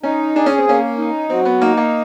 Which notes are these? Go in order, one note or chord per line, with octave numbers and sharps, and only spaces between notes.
C#4 D#4
D4 G#4
C#4
C4
A#3 C#4
D#4
F#3 C4
B3
A#3 D#4
A#3